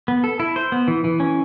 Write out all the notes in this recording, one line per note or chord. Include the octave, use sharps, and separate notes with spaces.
B3
A4
E4
C5
B3
E3
E3
C#4